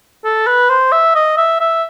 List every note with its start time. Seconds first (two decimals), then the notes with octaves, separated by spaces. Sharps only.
0.24 A4
0.47 B4
0.69 C5
0.92 E5
1.15 D#5
1.37 E5
1.60 E5